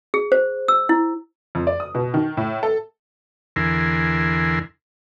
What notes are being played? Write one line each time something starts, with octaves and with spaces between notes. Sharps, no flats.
G#4
C5
E6
E4
F2
D5
D#6
B2
D#3
A2
A4
E2 D3 E4 A#4 G#5 C6